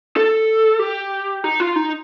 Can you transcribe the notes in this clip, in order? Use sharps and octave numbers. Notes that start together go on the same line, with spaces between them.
A4
G4
D#4
F4
D#4